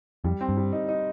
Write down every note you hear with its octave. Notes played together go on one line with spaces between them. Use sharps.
F2 G3
C4
G2
G3
D#4
D#4